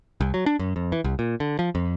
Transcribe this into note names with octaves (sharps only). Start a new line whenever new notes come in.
C2
F#3
D4
F#2
F2
E3
C2
A#2
D3
F3
F2